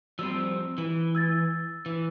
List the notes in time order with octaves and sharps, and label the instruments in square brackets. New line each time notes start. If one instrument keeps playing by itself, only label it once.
[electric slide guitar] F3 G3 C4 [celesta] E6
[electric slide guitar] E3
[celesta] E6 G#6 A6
[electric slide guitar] E3